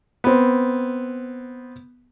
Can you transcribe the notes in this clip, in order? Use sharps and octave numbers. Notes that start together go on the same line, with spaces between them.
B3 C4